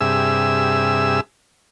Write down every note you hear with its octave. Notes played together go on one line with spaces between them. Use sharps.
G2 C3 G#4 E5 E6